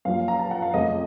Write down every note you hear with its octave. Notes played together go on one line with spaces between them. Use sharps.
F#2 F3 A#3 F5
A#5
A5
F#5
F5
F1 F2 C#3 A3 D#5